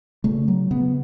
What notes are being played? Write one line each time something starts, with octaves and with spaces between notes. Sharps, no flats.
C#3 A3
F#3
C#3 B3